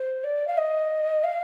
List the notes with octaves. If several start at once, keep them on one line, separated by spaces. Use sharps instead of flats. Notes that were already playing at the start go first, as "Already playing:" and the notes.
Already playing: C5
D5
F5
D#5
F5